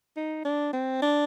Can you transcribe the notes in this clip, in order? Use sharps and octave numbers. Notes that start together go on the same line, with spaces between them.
D#4
D4
C4
D4